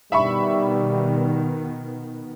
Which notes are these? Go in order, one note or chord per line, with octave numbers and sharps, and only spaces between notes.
B2 D#3 G3 B3 E5 B5 C#6